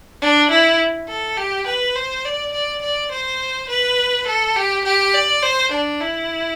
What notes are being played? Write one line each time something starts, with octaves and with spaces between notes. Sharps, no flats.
D4
E4
A4
G4
B4
C5
D5
D5
D5
C5
B4
A4
G4
G4
D5
C5
D4
E4